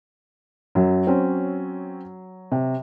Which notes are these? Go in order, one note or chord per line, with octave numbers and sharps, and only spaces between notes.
F#2 F#3
C4 C#4
C3